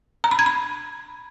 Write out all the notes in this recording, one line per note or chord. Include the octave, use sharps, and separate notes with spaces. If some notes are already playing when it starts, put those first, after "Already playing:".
A#5
B5
G#6
B5